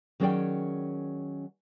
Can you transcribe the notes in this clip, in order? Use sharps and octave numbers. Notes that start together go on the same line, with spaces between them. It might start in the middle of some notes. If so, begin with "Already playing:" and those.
D#3 F#3 C#4 G#4 D5 G5